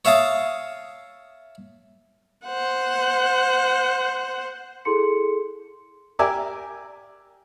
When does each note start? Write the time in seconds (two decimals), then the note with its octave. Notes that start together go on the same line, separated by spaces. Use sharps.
0.05 C#5 E5 F5 A5 D#6
2.46 C5 F#5
4.85 E4 G#4 A4 C6 C#7
6.19 G4 A#4 D5 E5 G#5